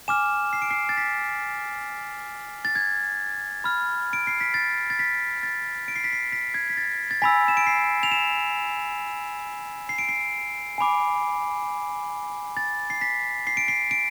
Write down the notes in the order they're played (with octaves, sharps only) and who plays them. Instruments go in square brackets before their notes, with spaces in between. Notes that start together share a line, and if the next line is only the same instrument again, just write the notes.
[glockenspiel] G#5 D6 F6 E7
C7
D7
C7
A6
B6
A6
G#6
B5 F6
D7
C7
B6
A6
A6
B6
A6
D7
C7
B6
C7
B6
G#6
B6
A6
A6
G#5 B5 E6 B6
E7
D7
C7
F7
E7
C7
D7
C7
G#5 B5 D6
A6
C7
B6
C7
D7
C7
D7